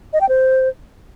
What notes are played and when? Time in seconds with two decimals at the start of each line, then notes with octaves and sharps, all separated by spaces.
0.13 D#5
0.21 G5
0.29 C5